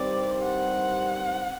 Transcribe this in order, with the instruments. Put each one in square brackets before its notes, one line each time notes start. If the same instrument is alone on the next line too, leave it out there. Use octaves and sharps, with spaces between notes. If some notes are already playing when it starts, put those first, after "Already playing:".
Already playing: [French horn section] G2 D#3 G3 C4 [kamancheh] D5
[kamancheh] F#5